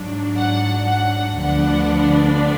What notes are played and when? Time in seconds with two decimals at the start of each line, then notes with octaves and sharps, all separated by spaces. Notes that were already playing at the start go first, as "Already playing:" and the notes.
Already playing: G#2 F#3 D4
0.36 F#5
0.87 F#5
1.37 D2 D3 F3 B3 D4 F#5